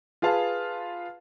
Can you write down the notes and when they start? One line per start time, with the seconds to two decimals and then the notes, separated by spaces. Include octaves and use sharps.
0.22 F4 G#4 B4 F5 A5